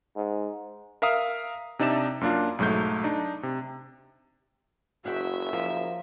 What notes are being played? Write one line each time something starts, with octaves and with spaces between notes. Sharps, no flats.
G#2
A#4 E5 F5 A#5 D#6
C3 D4 D#4 D5 E5 E7
F#2 A#3 D4 F4
B1 G#2 F#3 A3 G6
D4 D#4
C3
F#1 F#4 G#4 E5 F#5 G5
F3 A#4 C5